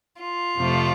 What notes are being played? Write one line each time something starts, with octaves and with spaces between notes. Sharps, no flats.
F4
F2 C3 F3 A3